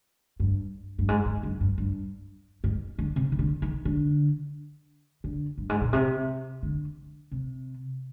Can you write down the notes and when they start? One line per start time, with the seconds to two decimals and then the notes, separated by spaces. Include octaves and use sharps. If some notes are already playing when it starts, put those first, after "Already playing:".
0.40 G2
0.99 G2
1.08 G#2
1.25 G#2
1.43 G2
1.61 G2
1.78 G2
2.64 G#2
2.98 D3
3.16 C3
3.32 D#3
3.39 D3
3.62 D#3
3.85 D3
5.24 D3
5.58 G2
5.69 G#2
5.81 A#2
5.93 C3
6.63 D3
7.31 C3